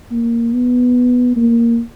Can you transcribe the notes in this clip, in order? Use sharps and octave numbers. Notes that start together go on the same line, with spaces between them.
A#3
B3
A#3